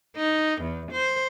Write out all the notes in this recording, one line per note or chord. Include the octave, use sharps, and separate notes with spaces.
D#4
E2
C5